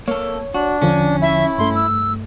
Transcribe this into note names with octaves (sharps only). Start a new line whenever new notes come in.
A#3 A4 C#5
D4 F#4
E2 D3 F3 C#4
E4 E5
G2 A3 C6
E6